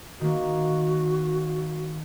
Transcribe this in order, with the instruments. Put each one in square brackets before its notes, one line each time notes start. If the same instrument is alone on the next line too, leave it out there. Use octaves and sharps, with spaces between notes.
[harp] D#3 A#3 [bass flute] F#4